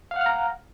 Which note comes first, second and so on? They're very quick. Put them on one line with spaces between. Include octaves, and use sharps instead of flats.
F5 F#5 F6 A#5